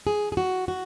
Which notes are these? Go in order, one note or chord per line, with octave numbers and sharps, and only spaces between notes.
G#4
G#4
F#4
F#4